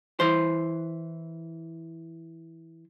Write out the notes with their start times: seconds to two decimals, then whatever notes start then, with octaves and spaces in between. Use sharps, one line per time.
0.20 E3 C5